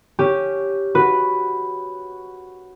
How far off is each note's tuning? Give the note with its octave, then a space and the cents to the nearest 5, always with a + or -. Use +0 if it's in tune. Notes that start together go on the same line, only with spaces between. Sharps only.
C#4 +5 G4 +0
F#4 +0 B4 +0